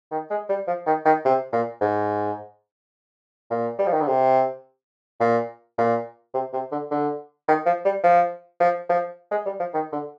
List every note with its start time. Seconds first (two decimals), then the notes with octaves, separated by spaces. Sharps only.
0.11 D#3
0.30 G#3
0.49 G3
0.67 F3
0.86 D#3
1.05 D#3
1.25 C3
1.53 A#2
1.81 G#2
3.50 A#2
3.78 G3
3.86 F3
3.93 D#3
4.01 D3
4.08 C3
5.20 A#2
5.78 A#2
6.34 C3
6.53 C3
6.72 D3
6.91 D3
7.48 D#3
7.66 F3
7.85 G3
8.04 F3
8.60 F3
8.89 F3
9.31 G#3
9.46 G3
9.60 F3
9.74 D#3
9.93 D3